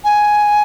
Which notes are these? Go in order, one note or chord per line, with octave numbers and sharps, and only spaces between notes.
G#5